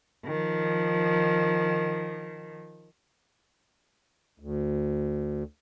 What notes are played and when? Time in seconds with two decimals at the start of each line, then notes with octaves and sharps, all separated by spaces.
0.25 D#3 F3
4.40 D2